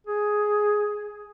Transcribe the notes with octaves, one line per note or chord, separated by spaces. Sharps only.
G#4